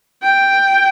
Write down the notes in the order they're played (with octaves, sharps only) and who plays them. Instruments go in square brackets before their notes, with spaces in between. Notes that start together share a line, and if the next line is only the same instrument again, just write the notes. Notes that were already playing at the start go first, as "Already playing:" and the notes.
[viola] G5